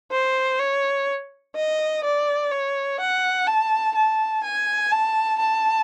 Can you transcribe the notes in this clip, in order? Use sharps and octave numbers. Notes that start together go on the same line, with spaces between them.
C5
C#5
D#5
D5
C#5
F#5
A5
A5
G#5
A5
A5